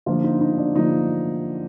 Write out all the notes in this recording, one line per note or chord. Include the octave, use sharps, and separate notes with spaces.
D3 F3 A#3 F4
D#4
D#4
D4
D3 F3 A#3 D#4